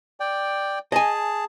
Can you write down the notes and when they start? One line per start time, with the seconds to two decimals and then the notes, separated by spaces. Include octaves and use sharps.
0.20 D5 G5
0.92 G#4 D#5 G#5 A5